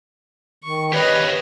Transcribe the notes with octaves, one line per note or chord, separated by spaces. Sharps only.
D#3 C#6
G4 B4 C#5 D#5 F5